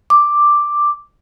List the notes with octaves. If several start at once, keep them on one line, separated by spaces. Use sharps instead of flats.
D6